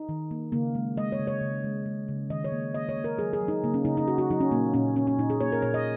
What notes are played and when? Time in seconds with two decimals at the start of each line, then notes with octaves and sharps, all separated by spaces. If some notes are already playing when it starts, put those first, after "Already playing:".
Already playing: D#4
0.09 D#3
0.31 A#3
0.52 C#3 A#3
0.75 G#3
0.97 G#3 D#5
1.12 C#5
1.19 C#3
1.27 C#5
1.41 C#3
1.64 G#3
1.86 G#3
2.08 C#3
2.30 D#3 D#5
2.44 C#5
2.52 A#3
2.74 A#3 D#5
2.89 C#5
2.97 A#3
3.04 A#4
3.19 F#3 G#4
3.33 G#4
3.41 F#3
3.48 D#4
3.63 C#3 A#3
3.74 C#4
3.85 C#3 D#4
3.97 D#4
4.08 A#3 F#4
4.18 F#4
4.30 F#3 D#4
4.41 C#4
4.52 A#2 A#3
4.74 A#2 C#4
4.96 A#2 C#4
5.07 C#4
5.18 A#2 D#4
5.30 G#4
5.40 A#3 C#5
5.52 A#4
5.62 A#2 C#5
5.74 D#5